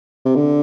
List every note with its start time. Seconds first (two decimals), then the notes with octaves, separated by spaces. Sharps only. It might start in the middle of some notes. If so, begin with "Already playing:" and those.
0.25 C3
0.36 D3